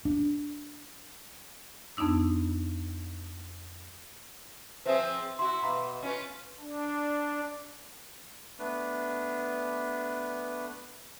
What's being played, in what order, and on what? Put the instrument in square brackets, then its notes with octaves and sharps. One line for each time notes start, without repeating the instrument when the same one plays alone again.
[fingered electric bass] D4
[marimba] F2 B3 D4 D#4 E6
[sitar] F3 C4 G#4 [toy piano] B4 C5 E5
[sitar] E4 F#4 [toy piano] C6
[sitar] B2 [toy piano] F5 A#5 B5
[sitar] C#4 F4 B4
[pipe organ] D4
[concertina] A3 B3 D4 B4